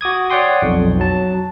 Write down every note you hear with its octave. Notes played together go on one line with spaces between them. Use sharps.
F#4 D6 D#6 G#6
C#5 D5 F#5 G5 C6 D#6
B1 F2
F#3 A5